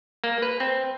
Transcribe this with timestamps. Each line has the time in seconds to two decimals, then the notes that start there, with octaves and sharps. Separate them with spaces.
0.24 A#3
0.42 B4
0.60 C4